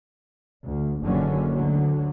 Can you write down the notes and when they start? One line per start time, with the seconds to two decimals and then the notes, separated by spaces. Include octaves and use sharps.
0.66 D2
1.02 F#1 A#2 D3 D#3 F#3 C#4
1.53 D2 D3 F#3